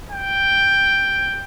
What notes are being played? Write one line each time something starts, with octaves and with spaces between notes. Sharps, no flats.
G5